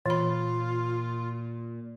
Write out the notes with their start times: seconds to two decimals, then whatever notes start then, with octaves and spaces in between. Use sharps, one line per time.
0.06 A#2 E3 F4 B5